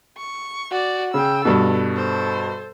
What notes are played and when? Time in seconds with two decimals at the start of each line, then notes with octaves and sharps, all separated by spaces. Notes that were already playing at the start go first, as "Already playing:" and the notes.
0.18 C#6
0.71 F#4 D5
1.14 C#3 G5 E6
1.45 G2 B2 A4
1.93 A4 C5